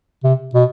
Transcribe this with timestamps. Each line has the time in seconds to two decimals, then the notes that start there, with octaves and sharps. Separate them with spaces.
0.24 C3
0.54 B2